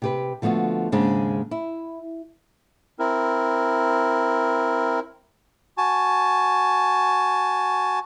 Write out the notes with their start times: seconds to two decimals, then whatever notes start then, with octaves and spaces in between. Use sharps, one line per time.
0.02 C3 G4 B4
0.42 D3 F3 A3 B3 F#4
0.92 D#2 G#2 C#3 G#3 D4 C5
1.51 E4
2.99 C4 E4 A#4
5.78 F#4 G#5 A5